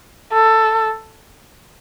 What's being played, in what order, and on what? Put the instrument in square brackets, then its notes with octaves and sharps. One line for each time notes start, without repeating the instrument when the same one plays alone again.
[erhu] A4